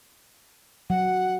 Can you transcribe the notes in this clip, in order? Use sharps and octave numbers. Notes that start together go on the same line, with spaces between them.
F#3 F#5